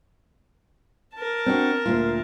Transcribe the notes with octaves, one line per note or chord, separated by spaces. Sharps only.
A#4 A5
C4 D4 F#4
D2 A#2 F4